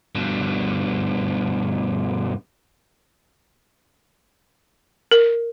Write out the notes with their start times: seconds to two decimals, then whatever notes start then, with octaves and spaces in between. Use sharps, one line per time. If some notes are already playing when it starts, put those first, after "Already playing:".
0.15 G2 B2
5.12 A#4